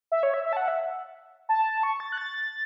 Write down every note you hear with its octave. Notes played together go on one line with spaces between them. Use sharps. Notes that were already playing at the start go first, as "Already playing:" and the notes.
E5
C#5
E5
E5
A5
F#5
E5
A5
C#6
A6
F#6
A6